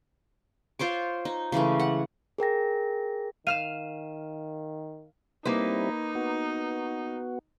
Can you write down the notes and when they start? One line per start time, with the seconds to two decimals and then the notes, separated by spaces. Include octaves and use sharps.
0.79 F4 C5 C#5 D6
1.25 D#4
1.52 C#3 E3 G#3 A3
1.80 F#5
2.38 G#4 A#4 G5 A#6
3.47 D#3 F5 F6 D#7 E7
5.45 G3 A#3 C4 D#4 E4 B4
6.15 B3 F#4